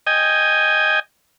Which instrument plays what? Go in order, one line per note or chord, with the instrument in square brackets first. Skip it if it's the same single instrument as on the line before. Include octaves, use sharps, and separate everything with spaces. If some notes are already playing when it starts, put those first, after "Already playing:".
[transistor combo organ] D#5 G5 G#5